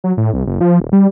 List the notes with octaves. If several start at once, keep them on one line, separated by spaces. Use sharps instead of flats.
F#3
A2
C2
F#1
F3
D#1
G3